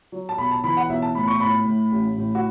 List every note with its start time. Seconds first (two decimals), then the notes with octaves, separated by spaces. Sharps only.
0.12 F#3
0.29 A5
0.38 B1 B5
0.51 A5
0.64 E3 B5
0.77 F#5
0.89 B1 E5
1.02 A5
1.15 A2 B5
1.28 C#6
1.40 A2 B5
1.66 A2
1.92 A1
2.17 A2
2.35 F#4